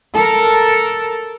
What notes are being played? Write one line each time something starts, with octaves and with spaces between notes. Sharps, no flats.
A4 A#4